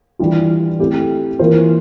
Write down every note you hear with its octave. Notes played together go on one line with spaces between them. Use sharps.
E3 G3 D4 F4
A3 C4 E4 G4
E3 A#3 F4 C5